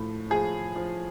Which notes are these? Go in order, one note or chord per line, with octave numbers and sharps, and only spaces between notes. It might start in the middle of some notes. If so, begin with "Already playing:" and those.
Already playing: A2 F3
F3 G#4
F3